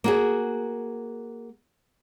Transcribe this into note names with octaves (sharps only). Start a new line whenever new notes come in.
A#3 F#4 G#4